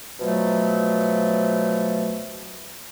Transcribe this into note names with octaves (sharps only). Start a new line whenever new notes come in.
B2 F3 F#3 A3